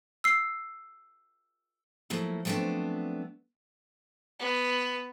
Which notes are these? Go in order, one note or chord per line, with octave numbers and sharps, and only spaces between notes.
E6 C7
F3 F#3 A3 A#3 E4
F3 F#3 A3 B3 C4 D4
B3